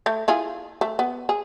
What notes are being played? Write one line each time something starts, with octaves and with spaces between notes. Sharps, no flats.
A3
E4 F4 G#4
A3
B3
G#4